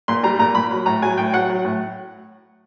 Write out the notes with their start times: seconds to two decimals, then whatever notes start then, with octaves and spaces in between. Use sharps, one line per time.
0.08 A#2 C6
0.23 G3 A#5
0.39 A#2 A#5
0.55 A#2 B5
0.71 F#3
0.86 A2 A#5
1.02 F#3 G#5
1.17 A2 G5
1.33 F#3 F#5
1.49 F#3
1.65 A2